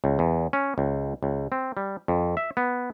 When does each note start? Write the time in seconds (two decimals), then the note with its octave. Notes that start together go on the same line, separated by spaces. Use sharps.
0.04 C#2
0.19 E2
0.53 C#4
0.78 C#2
1.23 C#2
1.52 C4
1.77 G3
2.08 F2
2.37 E5
2.57 B3